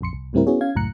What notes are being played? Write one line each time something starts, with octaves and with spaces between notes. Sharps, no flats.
A#1 F2 C6 C#7
C2
D2 A2 G3 C4 E4 A#4
B3 C#4 E4 F#4 G#4 C#5
C#4 F5 G#6
C#2 F#2 A2 A#5 F#6 C#7